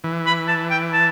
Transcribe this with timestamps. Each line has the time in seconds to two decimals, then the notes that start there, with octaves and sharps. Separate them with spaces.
0.04 E3
0.26 B5
0.48 A5
0.70 G5
0.93 A5